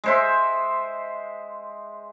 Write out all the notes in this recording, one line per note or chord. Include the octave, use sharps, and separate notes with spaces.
G#3 C5 E5